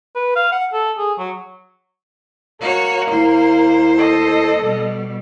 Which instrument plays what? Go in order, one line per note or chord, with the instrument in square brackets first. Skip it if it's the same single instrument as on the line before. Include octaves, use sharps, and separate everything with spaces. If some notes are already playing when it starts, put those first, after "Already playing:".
[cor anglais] B4
F5
F#5
A4
G#4
F#3
[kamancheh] A#3 [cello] F#4 C#5
[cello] D#2 C5 [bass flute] E4
[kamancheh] A4 D#5
[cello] B2 G3